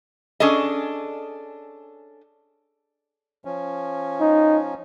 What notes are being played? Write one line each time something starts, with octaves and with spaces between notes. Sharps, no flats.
C#4 D4 G#4 A4 D#5
F3 C#4
D#4